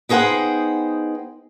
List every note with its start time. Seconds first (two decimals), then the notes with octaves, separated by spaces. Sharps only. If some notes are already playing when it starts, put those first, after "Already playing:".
0.09 B3 D#4 G#4 C5 F#5 G5